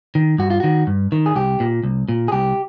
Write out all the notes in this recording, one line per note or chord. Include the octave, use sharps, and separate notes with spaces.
D#3
G2 F#4
F4
D#3 F#4
G2
D#3
G#4
C2 G4
A#2
C2
A#2
G#4
C2 G4